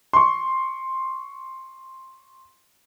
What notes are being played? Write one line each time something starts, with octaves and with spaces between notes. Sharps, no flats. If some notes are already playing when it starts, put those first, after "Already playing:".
C6 C#6